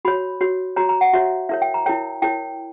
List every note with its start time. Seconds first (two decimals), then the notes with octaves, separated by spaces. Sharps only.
0.05 F#4 C#5 B5
0.41 F#4 C#5
0.76 F#4 C#5 A#5
0.89 A#5
1.01 F#5
1.13 F#4 C#5 E5
1.49 E4 A#4 C#5 E5
1.62 G5
1.74 A#5
1.86 E4 A#4 C#5 G5
2.22 E4 A#4 C#5 G5